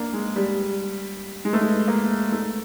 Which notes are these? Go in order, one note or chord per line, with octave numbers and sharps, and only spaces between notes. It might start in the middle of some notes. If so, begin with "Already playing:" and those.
Already playing: A#3 D4
G#3
G3
G#3
A3
G#3
A#3
A3